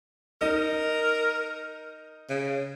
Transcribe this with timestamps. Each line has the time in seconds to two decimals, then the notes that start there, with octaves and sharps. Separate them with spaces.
0.41 D#4 A#4 D#5
2.30 C#3